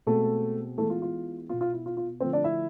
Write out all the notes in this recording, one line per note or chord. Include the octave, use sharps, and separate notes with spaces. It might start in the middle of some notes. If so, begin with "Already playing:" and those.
B2 G#3 A3 C4 A4
E3 G#3 A3 B3 A4
F4
F4
B2 B3 F4
F4
E4
F4
F4
D3 F3 A3 C4 C5
D4 D5
E4 E5